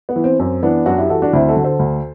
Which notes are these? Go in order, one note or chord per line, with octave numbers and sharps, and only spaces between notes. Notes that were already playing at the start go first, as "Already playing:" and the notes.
B3
E3
C4
F#2 C4
E3 B3 D4
F#2 D4 F#4
E4 G4
E3 F#4 A4
D4 F#4
D2 C4 E4
F#4 A4
D3
A4 C5
D2